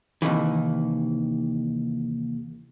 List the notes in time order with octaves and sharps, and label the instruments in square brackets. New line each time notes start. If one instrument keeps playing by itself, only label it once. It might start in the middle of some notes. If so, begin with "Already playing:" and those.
[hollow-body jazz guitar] D#2 C3 D#3 E3